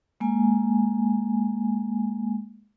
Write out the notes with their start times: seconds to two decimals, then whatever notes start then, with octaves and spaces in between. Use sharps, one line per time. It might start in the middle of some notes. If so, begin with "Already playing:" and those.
0.20 G#3 A#3 G#5